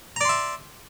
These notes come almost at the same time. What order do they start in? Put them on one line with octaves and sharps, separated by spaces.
A#5 D5 C6 E5